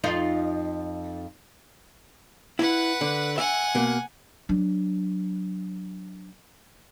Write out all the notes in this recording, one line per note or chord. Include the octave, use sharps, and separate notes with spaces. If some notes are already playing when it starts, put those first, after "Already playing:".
F2 D#4 F4
E4 B4 F#5
D3
E5 F#5 G#5
B2 A#3
F#3 D4